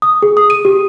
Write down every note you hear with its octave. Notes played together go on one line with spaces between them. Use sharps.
D#6
G#4
D#6
D#7
G4